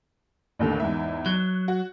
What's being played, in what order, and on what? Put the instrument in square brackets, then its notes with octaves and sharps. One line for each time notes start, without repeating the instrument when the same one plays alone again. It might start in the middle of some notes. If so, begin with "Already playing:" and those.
[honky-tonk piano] A1 D#2 D3
E2 G#2 E5
[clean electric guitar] F#3 [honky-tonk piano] F#6
[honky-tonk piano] F#4